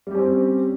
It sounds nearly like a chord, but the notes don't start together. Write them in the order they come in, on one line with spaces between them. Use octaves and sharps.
G3 G4 C#4 C4